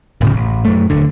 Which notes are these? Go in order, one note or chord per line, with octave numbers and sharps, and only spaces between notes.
D1 A2 C#3
A1
F#2 A3
D#1 D3